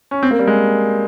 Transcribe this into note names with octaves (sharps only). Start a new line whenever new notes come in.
C#4
C4
A#3
G3
G#3